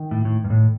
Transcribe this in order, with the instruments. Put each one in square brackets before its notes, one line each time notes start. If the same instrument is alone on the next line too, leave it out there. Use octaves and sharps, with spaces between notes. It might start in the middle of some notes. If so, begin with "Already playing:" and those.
Already playing: [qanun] D#3
[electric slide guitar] A2
A2
G2
A2